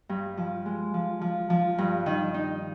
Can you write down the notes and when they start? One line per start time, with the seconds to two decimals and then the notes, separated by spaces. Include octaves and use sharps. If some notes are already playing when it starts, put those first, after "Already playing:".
0.09 G2
0.37 F3
0.66 G#3
0.94 F3
1.21 F3
1.50 F3
1.78 G2
2.06 D#3
2.34 D#4